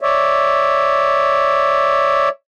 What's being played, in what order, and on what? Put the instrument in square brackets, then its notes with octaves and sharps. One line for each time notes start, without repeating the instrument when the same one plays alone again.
[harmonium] C#5 D5 E5